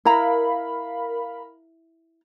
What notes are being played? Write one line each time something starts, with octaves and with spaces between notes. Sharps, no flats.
E4 A#4 F5 A#5 B5